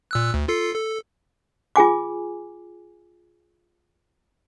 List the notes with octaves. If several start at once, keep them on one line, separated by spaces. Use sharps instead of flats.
A#2 E6 F#6
D2
F4 A4 C7
A4
F4 G#4 G#5 D6